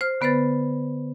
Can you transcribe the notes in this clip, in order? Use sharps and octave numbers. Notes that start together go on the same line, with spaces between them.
C5 F6
D3 B3 B4 C5 B5 A6